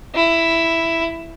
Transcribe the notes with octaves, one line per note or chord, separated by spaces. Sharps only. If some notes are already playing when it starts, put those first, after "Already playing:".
E4